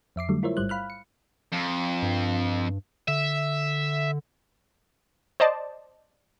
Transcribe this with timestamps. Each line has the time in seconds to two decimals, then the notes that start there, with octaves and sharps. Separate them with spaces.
0.16 F2 E5 D6 C7
0.29 D3 F#3 G3 A3
0.43 E4 F4 A#4 C5 C#5 E5
0.57 A1 G#2 G3 C5 F#6
0.69 F5 B5 F6 F#6
0.90 C#7
1.52 F2
2.02 G2
3.08 D3 E5
5.40 C5 D5 D#5 A5